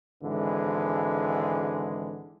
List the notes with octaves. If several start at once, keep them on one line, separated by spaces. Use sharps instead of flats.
G#1 D3 E3 G#3